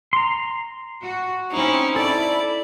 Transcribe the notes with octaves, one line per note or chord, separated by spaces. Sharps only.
A#5 C6
F#4
C4 C#4 D#4 E4
E4 A4 D5